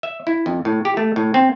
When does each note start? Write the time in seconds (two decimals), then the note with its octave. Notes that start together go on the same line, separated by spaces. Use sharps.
0.03 E5
0.27 E4
0.46 F2
0.65 A2
0.85 G4
0.97 A3
1.16 A2
1.34 C4